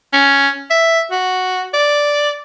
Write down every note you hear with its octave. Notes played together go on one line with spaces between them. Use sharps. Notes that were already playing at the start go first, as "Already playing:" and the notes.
C#4
E5
F#4
D5